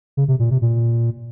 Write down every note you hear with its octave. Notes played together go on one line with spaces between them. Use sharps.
C#3
C3
A#2
C3
A#2